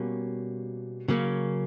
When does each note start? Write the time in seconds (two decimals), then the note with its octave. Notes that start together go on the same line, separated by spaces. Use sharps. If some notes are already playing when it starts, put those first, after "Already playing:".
Already playing: B2 G3 A#3 C#4
1.08 C#3 F#3 A#3 C#4